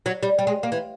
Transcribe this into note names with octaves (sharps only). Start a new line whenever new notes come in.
F#3
G3
G3
G#3
A#3
E3